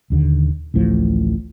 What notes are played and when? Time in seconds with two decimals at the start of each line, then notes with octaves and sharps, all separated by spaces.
0.10 D#1 D#2 D3
0.74 A1 D2 A2 F3